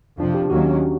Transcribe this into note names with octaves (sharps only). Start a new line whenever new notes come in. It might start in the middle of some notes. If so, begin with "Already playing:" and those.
F2 C3 F3 D4
G4
D#2 D#3 F#3 A#3 C#4 F#4